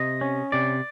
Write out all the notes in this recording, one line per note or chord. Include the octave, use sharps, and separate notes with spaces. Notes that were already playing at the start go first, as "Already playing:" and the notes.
Already playing: C3 D#5
C#4
C3 D5